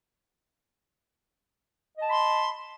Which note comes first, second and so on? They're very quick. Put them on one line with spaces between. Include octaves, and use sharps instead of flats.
D#5 A5 B5 C6